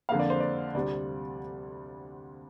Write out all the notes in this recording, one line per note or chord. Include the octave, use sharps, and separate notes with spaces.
F2 D3 A#3 F5
D5
C5
D5
D2 C3 G3 C4 D5